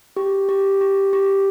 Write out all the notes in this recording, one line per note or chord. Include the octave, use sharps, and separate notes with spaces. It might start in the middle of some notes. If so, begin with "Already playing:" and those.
G4
G4
G4
G4